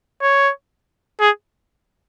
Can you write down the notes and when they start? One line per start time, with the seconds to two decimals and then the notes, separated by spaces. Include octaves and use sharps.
0.22 C#5
1.20 G#4